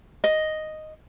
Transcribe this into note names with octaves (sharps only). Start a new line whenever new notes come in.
D#5